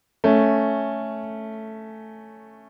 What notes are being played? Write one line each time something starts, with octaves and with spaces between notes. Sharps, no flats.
A3 C#4